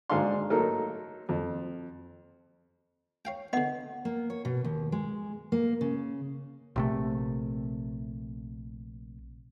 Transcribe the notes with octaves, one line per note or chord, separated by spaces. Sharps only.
G#2 D3 D4 F5 C6
F#3 A3 A#3 D#4 A4 A#4
F2
C#5 F5 G5
D3 B3 D#5 F#5
A#3
C#5
B2
D#2
G#3
A#3
C#3
A#1 C3 A3